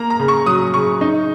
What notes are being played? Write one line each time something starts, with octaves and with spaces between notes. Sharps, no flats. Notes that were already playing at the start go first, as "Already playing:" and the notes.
Already playing: A#3 A#5
A#5
C#3
C#6
F#3 D#6
C#3 C#6
D#4